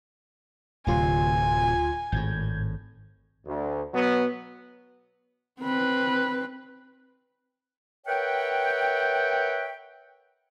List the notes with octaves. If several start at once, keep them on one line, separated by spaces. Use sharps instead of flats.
D1 D2 C3 F#3 F4 G#5 C6
G#1 A2 G6 G#6
D2
B2 F#3 B3
C4 B4
A#4 B4 C#5 E5 F#5 G5